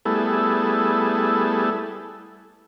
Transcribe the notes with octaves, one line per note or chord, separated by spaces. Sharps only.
G3 A3 B3 E4 G#4 A4